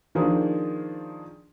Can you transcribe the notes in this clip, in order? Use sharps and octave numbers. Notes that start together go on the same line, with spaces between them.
D#3 F3 A#3 D4 G#4